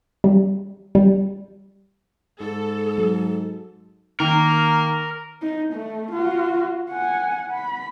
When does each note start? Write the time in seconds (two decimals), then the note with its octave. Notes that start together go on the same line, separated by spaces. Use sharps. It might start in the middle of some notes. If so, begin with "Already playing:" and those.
0.24 G3
0.95 G3
2.41 G#2 A4
2.98 F#3
4.20 D#3 A#3 A#4
5.42 D#4
5.73 A3
6.11 F4 F#4
6.90 F#5 G#5
7.52 B5